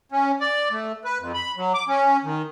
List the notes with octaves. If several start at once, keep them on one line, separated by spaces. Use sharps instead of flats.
C#4
D5
A3
B4
F2
B5
F#3
D6
C#4
D#3